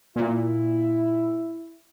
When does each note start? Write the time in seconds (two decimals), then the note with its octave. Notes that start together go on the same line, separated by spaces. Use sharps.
0.16 A#2 E4